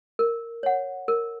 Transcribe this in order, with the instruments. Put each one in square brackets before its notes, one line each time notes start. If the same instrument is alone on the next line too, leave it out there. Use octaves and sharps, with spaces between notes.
[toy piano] A#4
C#5 F#5
A#4